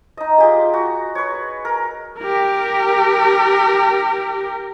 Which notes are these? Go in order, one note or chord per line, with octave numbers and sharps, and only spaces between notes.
D#4 D#5
F4 G4 G#4
F#4
B4 C#5
A#4
G4 A#4